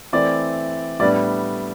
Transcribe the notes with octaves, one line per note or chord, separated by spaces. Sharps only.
E3 A3 C4 E4 D5
A2 G3 B3 D4 D5